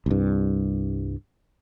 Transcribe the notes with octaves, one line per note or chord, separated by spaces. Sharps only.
C2 G2